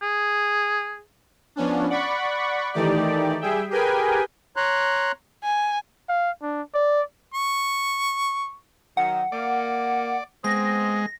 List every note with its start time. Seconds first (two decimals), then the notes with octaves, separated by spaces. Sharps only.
0.02 G#4
1.56 F3 B3 C#4 D4
1.89 D5 F#5 B5 C#6
2.73 D#3 E3 A3 D#4 G4 D5
3.41 G3 G#4 E5 G5
3.70 G4 G#4 A#4 B4 G5 G#5
4.56 C#5 A#5 C6 F#6
5.44 G#5
6.09 F5
6.43 D4
6.74 D5
7.34 C#6
8.97 D#3 F#3 F#5
9.32 A#3 D5
10.44 G#3 B3 C4 D#5 A#6